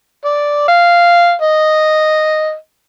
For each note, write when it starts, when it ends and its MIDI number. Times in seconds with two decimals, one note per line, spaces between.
0.25 0.65 74
0.68 1.34 77
1.42 2.54 75